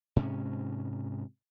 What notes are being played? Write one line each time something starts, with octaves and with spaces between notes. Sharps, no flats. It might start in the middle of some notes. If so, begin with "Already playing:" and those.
G#2 C3 C#4